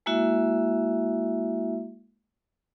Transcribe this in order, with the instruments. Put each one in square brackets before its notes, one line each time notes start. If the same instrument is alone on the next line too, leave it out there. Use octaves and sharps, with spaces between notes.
[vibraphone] G#3 A#3 E4 F#4 E5